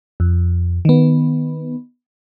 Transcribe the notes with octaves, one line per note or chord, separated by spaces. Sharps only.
F2
D#3 B3